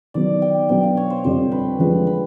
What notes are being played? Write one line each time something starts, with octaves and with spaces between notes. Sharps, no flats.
D#3 F#3 B3 D5
G5
B2 F#3 B3 D4 G5
F5
C#5
C5
F2 D3 G3 C5
B4
D3 F3 G#3 B4
B4